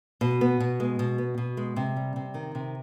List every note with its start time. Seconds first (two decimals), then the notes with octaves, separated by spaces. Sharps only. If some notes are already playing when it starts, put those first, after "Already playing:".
0.21 B2
0.41 B3
0.60 B2
0.80 G#3
0.99 B2
1.18 B3
1.38 B2
1.57 G#3
1.76 C3
1.96 G3
2.16 C3
2.34 D#3
2.55 C3